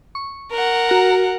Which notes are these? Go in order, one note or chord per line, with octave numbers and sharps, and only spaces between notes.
C#6
A#4 F#5
F#4 A#5